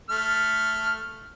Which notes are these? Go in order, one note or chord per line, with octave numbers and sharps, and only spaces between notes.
A3 F6